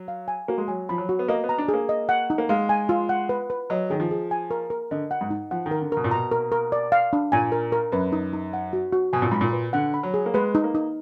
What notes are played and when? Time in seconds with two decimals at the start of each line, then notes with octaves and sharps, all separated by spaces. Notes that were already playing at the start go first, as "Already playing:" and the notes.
Already playing: F#3
0.08 F5
0.28 G#5
0.48 A#3 F#4
0.58 G#3
0.68 F#3 G#5
0.89 F3 B5
0.98 F#3
1.09 F#4
1.19 B3
1.28 A#3 D#5
1.44 B3
1.49 A#5
1.58 D4
1.69 G#4
1.74 A#3
1.89 D#5
2.09 F#5
2.30 D#4
2.38 A#3
2.49 G#3 F5
2.69 G#5
2.89 F4
3.09 F#5
3.29 B4
3.50 B4
3.70 F#3 D#5
3.90 D#3 G#4
4.00 F3
4.11 G#4
4.31 G#5
4.51 A#4
4.70 A#4
4.91 D3 D#5
5.11 F#5
5.21 G#2
5.31 D#4
5.51 F3 F#5
5.66 D#3
5.71 A#4
5.81 D3
5.92 B2 A#4
6.04 A#2
6.11 B2 A#5
6.32 A#4
6.52 A#4
6.72 D5
6.92 F5
7.13 D4
7.32 A#2 G#5
7.52 A#4
7.72 A#4
7.92 F#2 B4
8.12 D#4
8.33 D#4
8.53 F#5
8.73 F#4
8.93 F#4
9.13 B2 G#5
9.22 A#2
9.32 G#2 B5
9.41 A#2
9.53 B4
9.73 D3 F#5
9.94 B5
10.03 F#3
10.14 G#4
10.26 A#3
10.34 G#3 B4
10.55 D#4
10.64 A#3
10.75 D#4